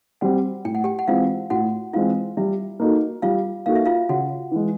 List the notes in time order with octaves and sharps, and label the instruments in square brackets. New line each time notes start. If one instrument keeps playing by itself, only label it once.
[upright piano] G3 C4 [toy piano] F#4 F#5
[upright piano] A2 [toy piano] G5
[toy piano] F#5
G4 G5
F#5
[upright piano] E3 G#3 C4 [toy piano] F4 F5
[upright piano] A2 [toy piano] F#4 F#5
[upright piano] E3 G#3 C4 [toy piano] F4 F5
[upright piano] G3 [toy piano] E4 E5
[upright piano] A#3 D#4 F#4 A4
[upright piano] G3 [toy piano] F4 F5
[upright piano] A#3 D#4 F#4 A4 [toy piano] F5
[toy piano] E5
F4 F5
[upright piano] C#3 [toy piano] F#4 F#5
[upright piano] E3 G#3